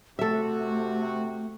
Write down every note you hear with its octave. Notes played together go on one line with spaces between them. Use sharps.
C3 A3 F#4 A4 E5